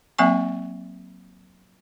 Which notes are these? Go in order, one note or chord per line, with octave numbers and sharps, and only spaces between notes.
F#3 A#3 C4 E5 G#5 C#6